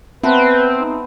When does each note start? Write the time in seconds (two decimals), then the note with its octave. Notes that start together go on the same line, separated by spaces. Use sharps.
0.23 B3 C4 B4 E5 F#5 A5 C6
0.77 D#4